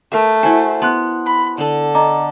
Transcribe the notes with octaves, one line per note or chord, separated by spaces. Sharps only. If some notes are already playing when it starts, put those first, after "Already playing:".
A3 A#4 E5
E4 F#4 C5 G#5
B3 A5 C6 F#6
B5
D3 D4 A4
D#5 A#5 D6